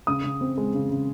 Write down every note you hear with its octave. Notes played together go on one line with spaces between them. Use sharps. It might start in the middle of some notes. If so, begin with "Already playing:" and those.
C#3 D#6
C#3
C4
G#3
C#3
C#3